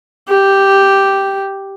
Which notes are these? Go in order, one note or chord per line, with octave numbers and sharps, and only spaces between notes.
G4